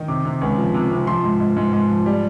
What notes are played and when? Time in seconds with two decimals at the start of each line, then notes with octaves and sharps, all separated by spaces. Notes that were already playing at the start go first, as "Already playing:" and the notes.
Already playing: D#3
0.08 C3 D6
0.25 C3
0.41 C#2
0.58 F3
0.74 C3
0.91 C3
1.07 F3 C6
1.24 G#2
1.40 G#2
1.57 G#2
1.73 G#2
1.89 F3
2.06 G3